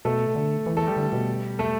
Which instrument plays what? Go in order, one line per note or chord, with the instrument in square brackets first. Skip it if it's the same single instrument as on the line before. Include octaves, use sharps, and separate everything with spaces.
[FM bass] B2 [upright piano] A3 A4
[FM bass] D3
E3
[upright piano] A3 A4
G3 G4
[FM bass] D3
B2
[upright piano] A3 A4